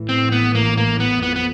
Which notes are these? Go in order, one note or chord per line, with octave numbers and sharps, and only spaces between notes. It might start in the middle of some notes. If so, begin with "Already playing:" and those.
Already playing: A1 A2 E3
C4
B3
A#3
A#3
B3
F2 B3
B3